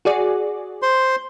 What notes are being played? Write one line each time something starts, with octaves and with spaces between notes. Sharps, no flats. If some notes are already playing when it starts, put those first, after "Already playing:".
F#4 G#4 D5
C5 C6